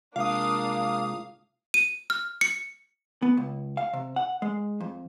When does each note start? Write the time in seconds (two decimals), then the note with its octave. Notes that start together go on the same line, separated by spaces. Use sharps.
0.16 C3 G#3 A#3 D4 F4 F5 D#6
1.74 D#7
2.10 F6
2.41 C#7
3.22 B3
3.37 C#2
3.77 F5
3.93 C3
4.16 F#5
4.42 G#3
4.81 F2